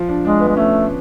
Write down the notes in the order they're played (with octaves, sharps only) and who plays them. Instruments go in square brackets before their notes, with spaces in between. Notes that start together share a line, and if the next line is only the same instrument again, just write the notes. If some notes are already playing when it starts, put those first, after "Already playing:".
Already playing: [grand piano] F3
D4
[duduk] G#3 [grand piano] D4
[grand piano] B3
[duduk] G#3
[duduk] A3 [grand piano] C#4